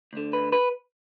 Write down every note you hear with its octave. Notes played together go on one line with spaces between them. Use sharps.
D2 D3
B4
B4